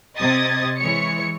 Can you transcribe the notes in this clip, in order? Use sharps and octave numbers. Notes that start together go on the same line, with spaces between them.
C3 D#5 D#6 G#6 A6
E3 G#3 C#5 C#7